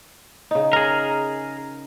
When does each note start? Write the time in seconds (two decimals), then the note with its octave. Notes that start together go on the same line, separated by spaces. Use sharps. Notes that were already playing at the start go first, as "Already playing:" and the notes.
0.51 C#3 D#4
0.73 G#4 A#4